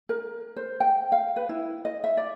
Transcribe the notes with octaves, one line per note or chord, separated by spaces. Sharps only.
A#4
C5
G5
F5
B4
E4
D#5
E5
D5